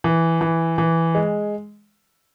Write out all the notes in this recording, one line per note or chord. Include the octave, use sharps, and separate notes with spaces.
E3
E3
E3
G#3